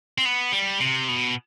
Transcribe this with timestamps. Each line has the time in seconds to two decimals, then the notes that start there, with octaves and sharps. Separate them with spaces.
0.18 C4
0.25 B3
0.52 G3
0.80 C3
1.08 B2